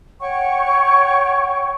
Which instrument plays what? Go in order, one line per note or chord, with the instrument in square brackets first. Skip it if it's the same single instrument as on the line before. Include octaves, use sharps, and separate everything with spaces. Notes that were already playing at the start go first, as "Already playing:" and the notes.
[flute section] C#5 F#5 G5 C#6